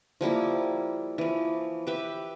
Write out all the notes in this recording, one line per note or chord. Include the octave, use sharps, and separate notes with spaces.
F3 G3 A#3 E4
E3 F3
G4 B4 E5